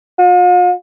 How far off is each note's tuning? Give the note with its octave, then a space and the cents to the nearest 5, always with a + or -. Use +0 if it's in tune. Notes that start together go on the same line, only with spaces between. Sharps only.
F4 +45